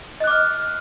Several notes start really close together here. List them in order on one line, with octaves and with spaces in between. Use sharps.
D#5 F#6 D6 F6